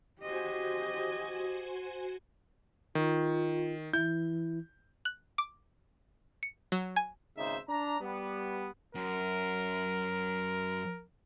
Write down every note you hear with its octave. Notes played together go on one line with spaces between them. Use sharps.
F#4 G4 C5 D#5 G#5
D#3 F4
E3 E4 G6
F#6
D6
C#7
F#3
G#5
G#1 C#3 D#4 C5 E5
D4 A#5
G3 B3
F#2 A#4